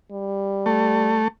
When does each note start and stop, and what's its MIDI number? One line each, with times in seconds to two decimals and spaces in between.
0.12 1.23 55
0.66 1.28 57